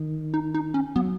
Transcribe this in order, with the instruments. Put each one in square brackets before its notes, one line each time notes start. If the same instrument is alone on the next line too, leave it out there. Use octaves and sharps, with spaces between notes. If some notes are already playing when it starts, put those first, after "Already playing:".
Already playing: [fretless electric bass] D#3
[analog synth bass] D#4
D#4
C#4
[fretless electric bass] F#3 [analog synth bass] B3